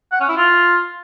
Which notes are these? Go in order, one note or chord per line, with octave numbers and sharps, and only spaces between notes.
F#5
C#4
E4
F4